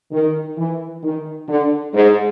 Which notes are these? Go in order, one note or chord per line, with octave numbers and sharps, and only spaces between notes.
D#3
E3
D#3
D3
G#2